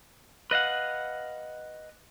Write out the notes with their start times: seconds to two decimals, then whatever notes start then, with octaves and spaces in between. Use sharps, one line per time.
0.51 B4 D#5 F5 F#5